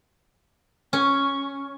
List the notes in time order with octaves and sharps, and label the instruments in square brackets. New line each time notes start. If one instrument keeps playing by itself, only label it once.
[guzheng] C#4 [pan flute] C#6